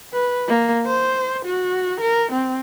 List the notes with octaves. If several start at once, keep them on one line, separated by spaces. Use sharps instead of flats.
B4
A#3
C5
F#4
A#4
C4